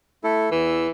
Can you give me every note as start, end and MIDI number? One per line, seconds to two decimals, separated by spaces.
0.24 0.50 57
0.24 0.50 64
0.24 0.50 69
0.51 0.87 40
0.51 0.90 52
0.51 0.87 88